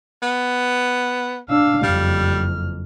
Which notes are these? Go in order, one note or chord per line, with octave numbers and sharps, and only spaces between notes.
B3
D4 F5 E6
F#1 F2 G3 F6